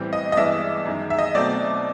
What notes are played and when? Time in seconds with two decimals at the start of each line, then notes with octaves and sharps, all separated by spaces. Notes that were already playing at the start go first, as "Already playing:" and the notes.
Already playing: A2 E3 G3 C4
0.13 D#5
0.32 D#5
0.37 G2 E3 G#3 B3 D5 E5
0.86 F#2 D#3 G#3
1.10 E5
1.19 D#5
1.35 B2 F#3 A3 C4 D5